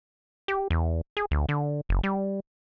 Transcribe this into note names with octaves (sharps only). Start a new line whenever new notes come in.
G4
E2
G#4
D2
D3
F#1
G3